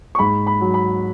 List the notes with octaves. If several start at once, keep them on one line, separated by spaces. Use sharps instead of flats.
C#6
G#2 B5
B5
F#3
B5